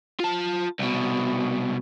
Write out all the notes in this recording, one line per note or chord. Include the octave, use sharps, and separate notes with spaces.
F4 A5
C2 B2